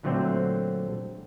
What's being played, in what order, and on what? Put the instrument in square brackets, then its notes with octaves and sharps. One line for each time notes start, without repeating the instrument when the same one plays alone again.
[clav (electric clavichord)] A#2 D3 F#3 A3 C4